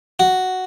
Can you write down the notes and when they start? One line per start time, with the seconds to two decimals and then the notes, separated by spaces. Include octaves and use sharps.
0.20 F#4